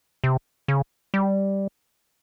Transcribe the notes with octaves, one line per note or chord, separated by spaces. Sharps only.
C3
C#3
G3